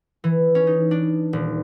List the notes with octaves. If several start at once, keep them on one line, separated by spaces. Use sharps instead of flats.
E3
C#4
D#4
D4
D#1